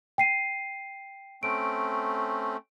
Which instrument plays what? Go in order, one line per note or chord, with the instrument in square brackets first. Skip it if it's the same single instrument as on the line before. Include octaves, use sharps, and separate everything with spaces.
[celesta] G5 C7 D#7
[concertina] A3 C4 C#4 [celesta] D7